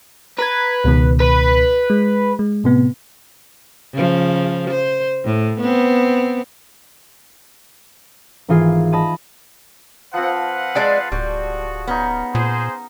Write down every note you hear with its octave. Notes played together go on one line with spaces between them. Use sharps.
B4 A#5 G#6
C#2 B2 D#3
B4
G#3
G#3
A2 C3 B3
C#3 F3
C5
A2
B3 C4
G#1 E3 F4 G#4 C7
D#5 A5 B5 A6 D#7
F3 C4 B4 F5 F#5
G#3 G#4 D5 G#5 A5 C6
D1 G3 F#4
B3 C#4 D#4
A#2 G#4 C5